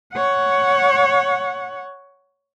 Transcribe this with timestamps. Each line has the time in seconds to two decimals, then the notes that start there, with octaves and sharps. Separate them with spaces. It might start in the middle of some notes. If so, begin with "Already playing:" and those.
0.13 C#5 F#5